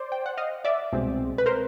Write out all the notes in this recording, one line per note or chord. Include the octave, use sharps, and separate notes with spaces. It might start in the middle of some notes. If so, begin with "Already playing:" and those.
Already playing: C5 D5
G5
F#5
D#5 F5
D5 E5
C2 B2 G#3 C4
B4
A#4 C5